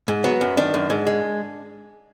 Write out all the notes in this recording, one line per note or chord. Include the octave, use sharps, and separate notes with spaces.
G#2
F#3 B3
F#2
D#3 D4
F#2
G#2
G#3